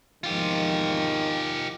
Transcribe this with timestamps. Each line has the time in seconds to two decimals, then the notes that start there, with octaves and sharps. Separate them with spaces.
0.24 G#1 E2 D#3 F3 F4 G4